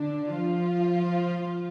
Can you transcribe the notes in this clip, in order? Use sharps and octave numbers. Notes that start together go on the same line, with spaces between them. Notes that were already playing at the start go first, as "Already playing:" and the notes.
Already playing: D3 D4
F3 F4